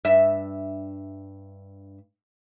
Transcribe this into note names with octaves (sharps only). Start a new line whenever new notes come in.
G2 E5